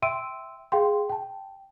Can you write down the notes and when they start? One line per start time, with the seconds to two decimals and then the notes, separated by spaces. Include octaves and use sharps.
0.02 E5 G5 C6 E6 D7 D#7
0.72 G#4 F5 G5 C6
1.09 G5 A5